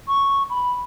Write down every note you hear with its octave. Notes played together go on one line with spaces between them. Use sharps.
C#6
B5